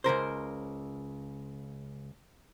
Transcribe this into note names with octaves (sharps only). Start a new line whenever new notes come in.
C#2 F#2 A#4 C5